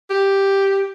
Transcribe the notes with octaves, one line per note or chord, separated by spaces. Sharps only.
G4